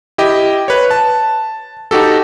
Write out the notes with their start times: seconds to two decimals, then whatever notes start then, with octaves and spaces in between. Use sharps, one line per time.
0.18 E4 G4 D#5
0.68 B4 C#5
0.91 A5
1.91 D#4 F#4 G4 A4